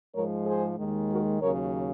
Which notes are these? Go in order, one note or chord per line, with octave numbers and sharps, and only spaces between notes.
G#2 F3 G#3 A#4 C#5
G#4 C5
D#2 D#3 G#3
F#4 A#4
D#2 C#3 F#3 A#4 C#5